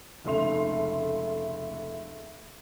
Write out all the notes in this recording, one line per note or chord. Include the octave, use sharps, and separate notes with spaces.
F1 C#2 A3 C6 F7